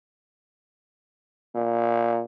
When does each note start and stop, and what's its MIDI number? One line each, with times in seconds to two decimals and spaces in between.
1.55 2.22 46